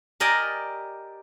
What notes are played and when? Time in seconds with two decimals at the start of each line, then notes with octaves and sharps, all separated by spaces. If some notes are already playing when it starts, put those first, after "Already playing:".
0.20 G4 A#4 D5 D#5 G#5